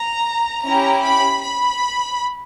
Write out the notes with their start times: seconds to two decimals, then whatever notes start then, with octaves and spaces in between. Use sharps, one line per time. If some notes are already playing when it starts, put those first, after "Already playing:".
Already playing: A#5
0.64 C#4 E4 G4 A#5
1.03 B5
1.42 B5